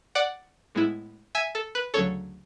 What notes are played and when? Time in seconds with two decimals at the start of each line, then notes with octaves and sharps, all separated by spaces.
0.15 D5 F#5
0.75 A2 G#3 B3 E4
1.35 E5 G#5
1.55 A4
1.75 B4
1.94 D2 C#3 F#3 A4 C#5